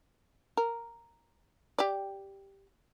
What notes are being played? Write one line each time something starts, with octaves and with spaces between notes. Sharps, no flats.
A#4
G4 D5